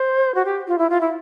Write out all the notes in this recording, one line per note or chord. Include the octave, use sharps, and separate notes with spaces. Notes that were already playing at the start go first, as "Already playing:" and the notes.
Already playing: C5
F#4
G4
F4
E4
F4
E4